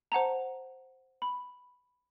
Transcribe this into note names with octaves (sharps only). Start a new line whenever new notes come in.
C5 F#5 A5 A#5
B5